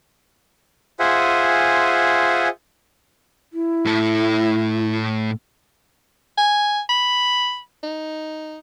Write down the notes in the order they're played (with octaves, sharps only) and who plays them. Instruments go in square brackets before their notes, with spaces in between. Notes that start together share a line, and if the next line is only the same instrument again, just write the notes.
[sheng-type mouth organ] F4 G#4 C5 E5 F#5 G#5
[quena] E4
[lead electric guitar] A2 A4
[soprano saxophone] G#5
B5
D#4